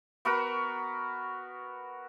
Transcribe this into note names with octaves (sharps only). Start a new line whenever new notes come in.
B3 F#4 A#4 B5